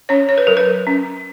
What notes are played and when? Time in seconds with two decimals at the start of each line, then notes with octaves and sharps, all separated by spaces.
0.09 C#4 C#5
0.29 C#5
0.38 B4
0.47 F#3 A#4
0.57 B4
0.87 C#4